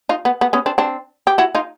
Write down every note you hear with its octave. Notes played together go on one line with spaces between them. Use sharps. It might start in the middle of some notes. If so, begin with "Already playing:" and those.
D#4 F4
B3
B3
B3 C#4
C4 D4
C4 D4
G4
E4 F#4
D#4 F4